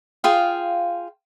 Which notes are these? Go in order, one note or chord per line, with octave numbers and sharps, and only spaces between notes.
F4 G#4 F5 G5